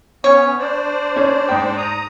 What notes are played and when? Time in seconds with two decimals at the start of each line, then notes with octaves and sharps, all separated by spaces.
0.24 B3 C#4 C#5
0.59 D4 C5 D5
1.16 C#4
1.49 G#2 G5
1.77 A#5 D#6